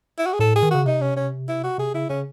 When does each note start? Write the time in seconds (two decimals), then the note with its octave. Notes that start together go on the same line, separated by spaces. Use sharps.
0.18 E4
0.26 F#4
0.33 G#4
0.39 A2 A4
0.56 G#4
0.63 D#3
0.71 C#3 F#4
0.86 C3 D#4
1.01 C#4
1.16 C#4
1.48 E4
1.64 F#4
1.78 C3 G#4
1.94 C#3 E4
2.09 C#3 C#4